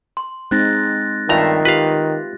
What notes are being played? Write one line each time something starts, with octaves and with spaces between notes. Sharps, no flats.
C6
G#3 C4 D#4 F#6 A6 A#6
G2 D#3 A3 F4 E5 F5 A#5
F4 G4 B4 F5